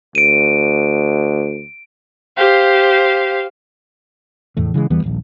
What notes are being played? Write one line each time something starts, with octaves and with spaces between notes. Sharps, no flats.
D2 D7 D#7
G4 C5 F5
F1 E2 A2 A3
C#3 E3 F#3 G#3
E2 E3 G3 B3
D#1 A#1